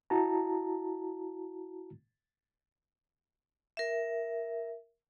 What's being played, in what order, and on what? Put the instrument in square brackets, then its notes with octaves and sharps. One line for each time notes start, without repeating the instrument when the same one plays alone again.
[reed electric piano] E4 F#4 A5 A#5
[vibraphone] A#4 E5